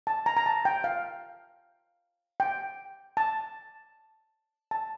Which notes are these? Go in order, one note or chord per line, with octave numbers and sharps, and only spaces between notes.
A5
A#5
A#5
A5
G5
F5
G5
A5
A5